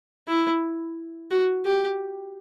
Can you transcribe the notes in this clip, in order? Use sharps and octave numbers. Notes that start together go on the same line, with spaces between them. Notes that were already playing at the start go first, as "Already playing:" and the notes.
E4
F#4
G4